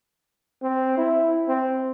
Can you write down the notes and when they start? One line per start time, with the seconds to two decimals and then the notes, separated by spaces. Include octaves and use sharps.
0.63 C4
0.98 E4
1.48 C4